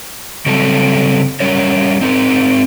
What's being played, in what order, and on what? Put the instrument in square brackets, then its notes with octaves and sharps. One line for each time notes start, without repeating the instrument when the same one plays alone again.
[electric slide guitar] C#3 F#3 G3 C4 A4 A5
G3 C#4 A#4 C#5
C4 D#4 A#4